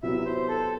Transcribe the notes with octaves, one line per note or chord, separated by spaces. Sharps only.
C3 F#3 B3 E4 E5
C5
A4